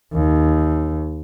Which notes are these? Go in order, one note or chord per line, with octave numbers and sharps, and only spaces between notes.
D#2